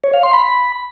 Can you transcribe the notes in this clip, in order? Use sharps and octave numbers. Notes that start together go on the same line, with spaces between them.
C#5
F5
C6
B5